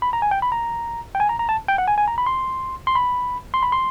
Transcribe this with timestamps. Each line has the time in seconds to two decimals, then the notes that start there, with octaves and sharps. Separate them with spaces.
0.02 B5
0.13 A#5
0.22 G#5
0.31 G5
0.42 B5
0.52 A#5
1.15 G5
1.20 G#5
1.29 A#5
1.39 A#5
1.49 A5
1.68 G5
1.78 F#5
1.88 G#5
1.98 G#5
2.08 A#5
2.18 B5
2.26 C6
2.87 C6
2.95 B5
3.54 C6
3.63 B5
3.72 C6